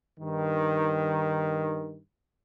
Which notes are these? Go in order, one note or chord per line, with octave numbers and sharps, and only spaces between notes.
G2 D#3